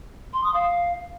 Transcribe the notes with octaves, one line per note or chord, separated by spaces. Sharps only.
C6
D#6
F5